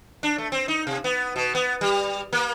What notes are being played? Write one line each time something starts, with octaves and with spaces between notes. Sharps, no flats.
D4
A3
C4
D#4
C3
B3
B2
B3
G3
A#3